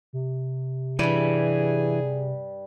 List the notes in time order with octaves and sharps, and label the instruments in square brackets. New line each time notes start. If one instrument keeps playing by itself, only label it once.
[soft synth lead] C3
[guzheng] G2 G3 [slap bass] E3 [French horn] G#4